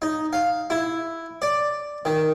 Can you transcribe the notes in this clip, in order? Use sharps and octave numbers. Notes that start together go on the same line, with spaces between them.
D#4
F5
E4
D5
D#3